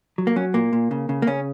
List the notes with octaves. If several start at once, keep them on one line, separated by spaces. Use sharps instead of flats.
F#3
A#3
F#3 C#4
A#2 A#3
A#2
C#3
C#3
A#3
C#3 C#4